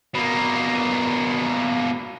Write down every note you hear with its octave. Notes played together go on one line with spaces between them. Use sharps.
B2 A#3